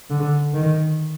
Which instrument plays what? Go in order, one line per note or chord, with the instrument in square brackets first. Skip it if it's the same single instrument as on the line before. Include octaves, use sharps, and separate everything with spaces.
[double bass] D3
D#3